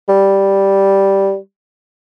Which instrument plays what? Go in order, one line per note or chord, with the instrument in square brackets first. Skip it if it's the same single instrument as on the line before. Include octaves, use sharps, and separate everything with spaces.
[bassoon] G3